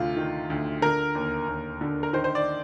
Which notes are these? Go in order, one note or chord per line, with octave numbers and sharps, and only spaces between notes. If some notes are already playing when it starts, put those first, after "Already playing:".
Already playing: D2 C3 F4
D#3
D2
D3 A#4
D#2
D#2
D3
A#4
D#3 C5
C5
D5